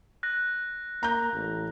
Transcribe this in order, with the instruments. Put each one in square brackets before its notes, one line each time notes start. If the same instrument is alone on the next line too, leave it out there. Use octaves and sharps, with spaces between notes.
[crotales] F#6 A#6
[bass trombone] A#3 [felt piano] A#5 G6
[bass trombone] A1